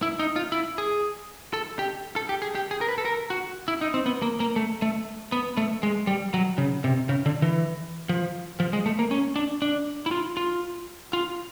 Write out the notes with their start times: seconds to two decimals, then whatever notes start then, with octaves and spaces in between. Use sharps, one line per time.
0.02 E4
0.19 D#4
0.36 F4
0.52 E4
0.78 G#4
1.53 A4
1.79 G4
2.16 A4
2.29 G4
2.42 G#4
2.55 G4
2.71 G#4
2.81 A#4
2.89 B4
2.98 A4
3.05 A#4
3.30 F#4
3.68 E4
3.81 D#4
3.94 C4
4.06 B3
4.22 A#3
4.40 A#3
4.56 A3
4.82 A3
5.32 B3
5.57 A3
5.83 G#3
6.07 G3
6.34 F#3
6.58 C#3
6.84 C3
7.09 C#3
7.26 D3
7.42 E3
8.09 F3
8.60 F3
8.73 G#3
8.86 A3
8.99 A#3
9.11 C#4
9.36 D4
9.62 D4
10.06 E4
10.11 F4
10.37 F4
11.13 F4